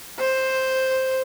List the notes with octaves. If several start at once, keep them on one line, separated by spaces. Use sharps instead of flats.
C5